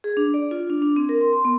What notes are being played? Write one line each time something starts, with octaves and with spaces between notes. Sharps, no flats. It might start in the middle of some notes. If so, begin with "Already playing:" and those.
G#4
D4
D5
F4
D4
D4
C4
A#4
C6
C6
B3